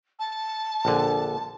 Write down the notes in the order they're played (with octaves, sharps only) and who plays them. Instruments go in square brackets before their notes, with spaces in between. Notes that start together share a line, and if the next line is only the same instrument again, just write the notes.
[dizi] A5
[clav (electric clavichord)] A#1 D3